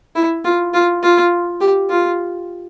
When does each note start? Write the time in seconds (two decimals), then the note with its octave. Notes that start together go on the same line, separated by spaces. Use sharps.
0.16 E4
0.45 F4
0.74 F4
1.03 F4
1.61 G4
1.90 F4